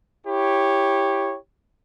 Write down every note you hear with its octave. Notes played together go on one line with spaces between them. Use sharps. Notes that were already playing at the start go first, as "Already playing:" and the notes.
E4 G4 C#5